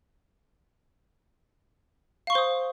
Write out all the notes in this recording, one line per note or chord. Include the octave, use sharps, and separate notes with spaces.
C5 F5 C6 C#6 D#6